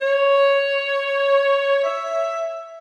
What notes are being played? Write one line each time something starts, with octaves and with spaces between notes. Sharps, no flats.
C#5
E5